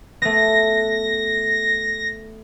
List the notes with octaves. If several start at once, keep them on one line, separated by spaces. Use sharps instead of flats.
A3 B3 A#6